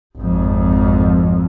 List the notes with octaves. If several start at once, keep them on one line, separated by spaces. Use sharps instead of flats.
G#1 F2